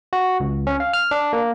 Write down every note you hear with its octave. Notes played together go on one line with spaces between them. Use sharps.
F#4
C#2
C#4
F5
F6
D4
A#3